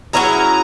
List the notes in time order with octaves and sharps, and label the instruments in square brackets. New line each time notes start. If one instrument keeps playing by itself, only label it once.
[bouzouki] F#3 C#4 E4 G#4 [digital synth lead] A#5